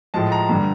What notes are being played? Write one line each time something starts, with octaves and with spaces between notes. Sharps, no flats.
A2 F3 G#3 A5
A#5
G2 D3 G3